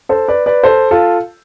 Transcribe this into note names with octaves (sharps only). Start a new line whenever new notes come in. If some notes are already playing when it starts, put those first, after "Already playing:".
A4 C5
B4 D5
B4 D5
A4 C5
F4 A4